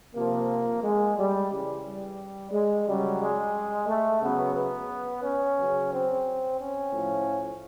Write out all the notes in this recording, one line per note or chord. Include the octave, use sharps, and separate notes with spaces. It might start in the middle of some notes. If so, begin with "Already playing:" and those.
C3 F3 A#3
G#3
G3
C#3 E3 G3
G3
G#3
C#3 F#3 G3
G#3
A3
C#3 F#3 B3
B3
C#4
C#3 F#3
C4
C#4
A2 F3